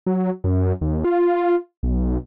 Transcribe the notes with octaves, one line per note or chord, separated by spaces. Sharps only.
F#3
F#2
D#2
F4
B1